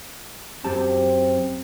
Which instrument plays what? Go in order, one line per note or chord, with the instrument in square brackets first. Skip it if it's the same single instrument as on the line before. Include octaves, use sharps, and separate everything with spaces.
[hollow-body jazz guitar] F#2 G4 A5 [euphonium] C4